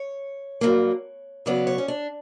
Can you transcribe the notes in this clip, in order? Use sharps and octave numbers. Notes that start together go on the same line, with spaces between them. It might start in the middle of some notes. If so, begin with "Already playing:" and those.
Already playing: C#5
G2 F#3 A#3
C#3 F#3 B3 D5
C#5
C#4
D4